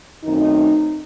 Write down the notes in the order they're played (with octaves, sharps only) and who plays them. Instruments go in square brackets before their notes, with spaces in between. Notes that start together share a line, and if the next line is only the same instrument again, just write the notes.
[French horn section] F#2 D#3 A3 C4 D#4